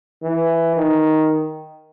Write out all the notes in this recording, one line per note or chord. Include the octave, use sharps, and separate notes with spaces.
E3
D#3